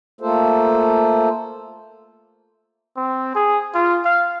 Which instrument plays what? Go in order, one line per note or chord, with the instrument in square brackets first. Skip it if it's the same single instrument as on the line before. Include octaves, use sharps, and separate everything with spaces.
[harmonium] A3 A#3 F4 A4 C5
[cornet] C4
G#4
F4
F5